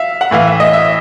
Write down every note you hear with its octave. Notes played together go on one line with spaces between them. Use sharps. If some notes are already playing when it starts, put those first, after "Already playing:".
Already playing: E5 F5
F#5
A2 E3 F5
E5
D#5
E5